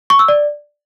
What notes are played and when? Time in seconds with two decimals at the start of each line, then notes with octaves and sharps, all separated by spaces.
0.10 C#6
0.19 E6
0.28 D5